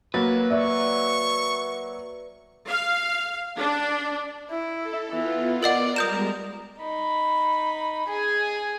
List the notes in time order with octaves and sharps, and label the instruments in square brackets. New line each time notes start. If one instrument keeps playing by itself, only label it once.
[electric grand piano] F#3 A#3 [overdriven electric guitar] B4 [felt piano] A6
[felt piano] D5 E5 [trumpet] C#6
[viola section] F5
D4
[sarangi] E4
[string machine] A4
[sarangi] E3 [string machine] B3 F4
[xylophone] A#4 D#5 F#5 [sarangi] D5
[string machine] G3 G#3 [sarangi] A#4 [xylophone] D#6 G6 E7
[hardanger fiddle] D#4 B5
G#4 G#5